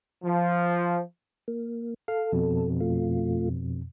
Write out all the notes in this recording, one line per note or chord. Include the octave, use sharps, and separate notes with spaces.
F3
A#3
A4 F5
F2 B2
A3 F4